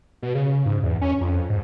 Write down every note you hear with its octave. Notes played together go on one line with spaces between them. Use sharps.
B2
C#3
G#2
E2
C#4
F2
G#2